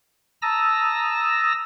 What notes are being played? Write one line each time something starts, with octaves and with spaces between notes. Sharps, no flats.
A5 A#5 D#6 E6 A#6